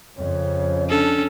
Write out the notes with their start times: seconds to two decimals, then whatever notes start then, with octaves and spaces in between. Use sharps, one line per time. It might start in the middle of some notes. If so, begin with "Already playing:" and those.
0.17 F2 C#3 C#5
0.89 C#4 D4 A4